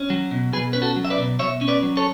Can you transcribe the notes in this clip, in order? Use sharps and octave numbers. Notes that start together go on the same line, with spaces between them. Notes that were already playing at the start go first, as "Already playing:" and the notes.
Already playing: C#4
F#3
B2
B2 G#4 B4
C#4 B4
F#4 A4
F#3
E5
B4 D5
B2
B2 C#5 E5
C#4
B4 D5
F#3
A4 C#5